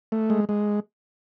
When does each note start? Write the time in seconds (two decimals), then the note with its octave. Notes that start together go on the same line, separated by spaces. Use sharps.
0.12 A3
0.30 G#3
0.49 G#3